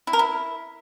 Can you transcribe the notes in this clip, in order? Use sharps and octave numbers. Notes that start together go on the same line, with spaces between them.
E4
A#4
E4